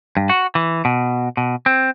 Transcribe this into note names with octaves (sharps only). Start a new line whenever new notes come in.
G2
F#4
E3
B2
B2
C4